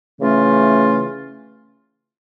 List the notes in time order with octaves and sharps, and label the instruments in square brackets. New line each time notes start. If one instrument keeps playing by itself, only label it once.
[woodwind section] C#3 E3 A3 C#4 F4